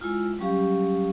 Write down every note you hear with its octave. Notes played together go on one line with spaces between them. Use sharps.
G#3 E4 F4
F#3 G3 C#4 G4 F5